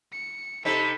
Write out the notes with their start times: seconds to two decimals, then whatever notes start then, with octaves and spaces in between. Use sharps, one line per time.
0.12 C#7
0.65 C3 D#4 A4 B5